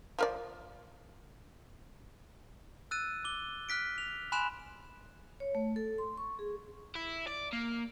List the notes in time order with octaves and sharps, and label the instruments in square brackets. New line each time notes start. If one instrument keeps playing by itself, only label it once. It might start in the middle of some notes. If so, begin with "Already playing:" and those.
[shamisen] F3 A#4 D5
[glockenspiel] E6 F#6 A6 D#7
D6 G7
F6 F#6 B6 D7
F7
G#5 B5 C6 F#6 D7 E7
[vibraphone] C#5
A3
A4
C6
C#6
G#4
[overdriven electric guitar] E4
D5
A#3